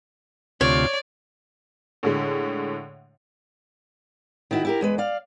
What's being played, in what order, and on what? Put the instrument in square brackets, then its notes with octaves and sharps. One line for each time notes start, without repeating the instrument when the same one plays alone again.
[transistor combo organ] D2 C3 F4 [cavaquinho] C#5 [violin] D5
[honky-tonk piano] A2 D3 G#3
[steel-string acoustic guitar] D#3 E4 F#4
E4 G4 A#4
E2 G#3 B4
D5 F5